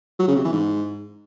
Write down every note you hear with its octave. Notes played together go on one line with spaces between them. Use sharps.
F#3
C#3
C3
E3
G#2